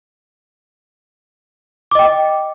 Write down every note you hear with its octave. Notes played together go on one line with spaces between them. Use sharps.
D#5 G5 D6